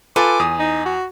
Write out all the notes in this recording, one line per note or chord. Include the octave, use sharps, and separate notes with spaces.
F4 A4 B4 G#5 D6
E2 D#6
D#4
F#4